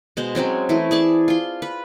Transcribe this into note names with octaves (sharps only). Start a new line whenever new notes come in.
B2 G#3 C5
F#3 G#3 C4 C#4
E3 A3 E4
G#4 D5 A5
F4 C6
B4